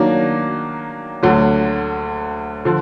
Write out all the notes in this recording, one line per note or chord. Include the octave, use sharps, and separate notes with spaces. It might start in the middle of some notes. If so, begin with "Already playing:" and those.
Already playing: D#3 F#3 A#3 D4 F#4
D2 D3 F#3
D3 F3